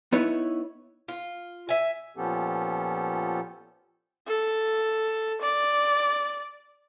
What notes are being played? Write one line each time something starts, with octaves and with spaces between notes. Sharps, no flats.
B3 D#4 E4 B4 C#5
F4
E5 G#5
A#2 F3 B3 C#4 G4 A4
A4
D5